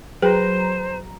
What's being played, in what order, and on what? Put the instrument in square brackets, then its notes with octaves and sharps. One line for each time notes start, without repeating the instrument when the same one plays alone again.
[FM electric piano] F#3 A#5 [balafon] G#4 [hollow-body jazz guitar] B4 G5 [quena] C5